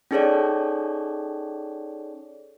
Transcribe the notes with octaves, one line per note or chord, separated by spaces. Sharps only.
C#4 D#4 G#4 A4 C#5 D5